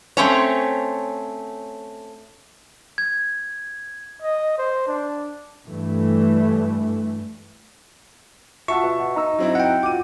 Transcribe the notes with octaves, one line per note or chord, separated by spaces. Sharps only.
A3 C4 C#4 C#5
G#6
D#5
C5
D4
G2 E3 A3
F4 F#4 E5 F#5 A5 C#6 E6
B2
D#4 A#5 E6
F#3 C4 E4
F#5 G5
F4 F#4 D6 D#7